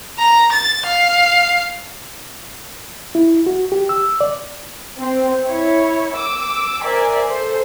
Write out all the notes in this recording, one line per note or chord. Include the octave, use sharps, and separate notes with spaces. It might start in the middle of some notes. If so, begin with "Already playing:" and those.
A#5
A6
F5
E4
F#4
G4
E6
D5
C4
E4 C#5
D6 E6
A#4 C5 D5 E5 G#5
A4 C5